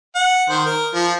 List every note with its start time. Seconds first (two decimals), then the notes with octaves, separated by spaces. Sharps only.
0.15 F#5
0.50 D#3 C5
0.66 A#4
0.94 F3